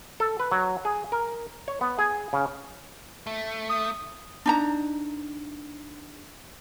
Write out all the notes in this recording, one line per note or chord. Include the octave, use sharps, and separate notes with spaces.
A4
B4
F#3
G#4
A#4
C#5
B3
G#4
C#3
A3
D#6
D4 D#4 A#5